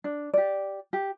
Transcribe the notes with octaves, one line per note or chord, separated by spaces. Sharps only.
D4
G4 D5
G4